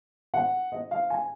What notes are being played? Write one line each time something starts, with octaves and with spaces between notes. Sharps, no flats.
F#5
D#5
F5
G#5